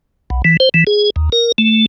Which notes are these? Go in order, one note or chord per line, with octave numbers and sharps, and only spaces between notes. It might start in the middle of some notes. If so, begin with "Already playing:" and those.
B1
E3
C5
E3
G#4
D#2
A#4
A3